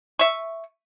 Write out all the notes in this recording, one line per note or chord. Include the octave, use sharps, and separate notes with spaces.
E5 C#6